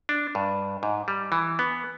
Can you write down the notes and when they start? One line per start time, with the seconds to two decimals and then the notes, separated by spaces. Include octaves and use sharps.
0.09 D4
0.35 G2
0.83 G#2
1.08 G3
1.32 E3
1.59 B3